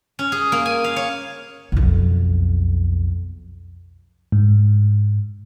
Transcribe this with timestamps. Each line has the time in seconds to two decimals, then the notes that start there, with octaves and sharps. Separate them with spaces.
0.19 C#4
0.32 G#4
0.52 A#3
0.66 G#5
0.84 F5
0.96 C#5
1.72 B1 F2
4.32 G#2